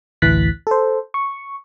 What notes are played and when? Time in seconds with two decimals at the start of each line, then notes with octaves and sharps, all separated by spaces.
0.22 A1 D2 E3 F#6 A6 B6
0.67 A4 C5
1.14 C#6